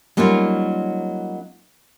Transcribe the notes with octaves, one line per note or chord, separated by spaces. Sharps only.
F#3 G3 A#3 C#4 D#4 F4